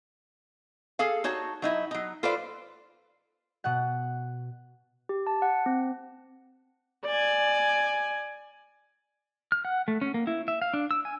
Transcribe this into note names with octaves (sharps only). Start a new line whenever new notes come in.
G#4 A4 F5
D#4 F#4 C#5 A5
F#3 D#4 E4
F#3 D#4
F4 A4 B4 C5 D5 F5
B2 F#5
G4
A5
F#5
C4
D5 G#5
F6
F#5
A3
C#4
A#3
E4
E5
F5
D4
E6
G#5